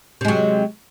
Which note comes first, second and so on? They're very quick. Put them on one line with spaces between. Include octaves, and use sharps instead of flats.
C3 G#3 F#3